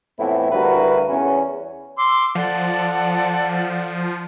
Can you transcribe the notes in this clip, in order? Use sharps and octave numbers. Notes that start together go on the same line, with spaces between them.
F2 A2 E3 B3 C4 E4
D2 G2 E4 F#4 A#4 B4
E2 C#4
C6 D6 E6
F3 A4 D5 F#5